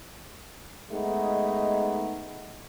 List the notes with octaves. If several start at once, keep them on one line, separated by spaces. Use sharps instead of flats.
G#3 A3 B3 D#4